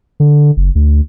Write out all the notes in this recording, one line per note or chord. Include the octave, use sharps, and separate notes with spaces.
D3
F#1
D2